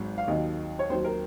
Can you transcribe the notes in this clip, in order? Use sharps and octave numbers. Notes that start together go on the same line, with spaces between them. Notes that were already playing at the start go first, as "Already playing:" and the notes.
Already playing: G#1 G#2 F#3
F5
D#2 D#3 F#3 D#5
C#5
D#2 D#3 F#3 C5
A#4